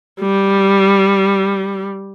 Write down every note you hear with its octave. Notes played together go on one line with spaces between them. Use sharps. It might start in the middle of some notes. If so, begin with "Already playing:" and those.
G3